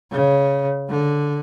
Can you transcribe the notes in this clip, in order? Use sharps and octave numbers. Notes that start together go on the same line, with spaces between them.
C#3
D3